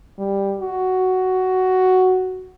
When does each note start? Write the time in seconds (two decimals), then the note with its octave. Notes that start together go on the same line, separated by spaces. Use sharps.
0.19 G3
0.60 F#4